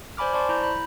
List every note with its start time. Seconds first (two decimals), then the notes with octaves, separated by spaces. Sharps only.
0.17 C5 D5 G#5 B5 D6 F6
0.33 C5 D5 A5 C6 C#6
0.49 E4 A#5 B5 G6
0.63 B5